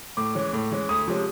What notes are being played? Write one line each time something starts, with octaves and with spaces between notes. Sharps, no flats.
A2 D6
E3 G#3 C#4
A2
E3 G#3 C#4
D2 D#6
C3 F3 G#3 C#4